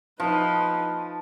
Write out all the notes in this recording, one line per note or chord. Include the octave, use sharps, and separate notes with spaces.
F3 D#4 B4